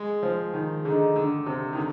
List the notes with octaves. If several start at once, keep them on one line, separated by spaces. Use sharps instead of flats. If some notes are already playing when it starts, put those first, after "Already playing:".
Already playing: G#3
F3
D#3
D3 G#4 D#5 A#5
D3
C3
D#3
D3 D4